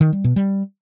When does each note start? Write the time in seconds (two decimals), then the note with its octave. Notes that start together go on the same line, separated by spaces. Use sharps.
0.01 D#3
0.13 G3
0.24 B2
0.36 G3